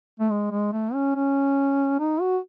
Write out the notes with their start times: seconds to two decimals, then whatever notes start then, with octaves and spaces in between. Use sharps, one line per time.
0.20 A3
0.31 G#3
0.51 G#3
0.73 A3
0.94 C#4
1.15 C#4
2.00 D#4
2.21 F#4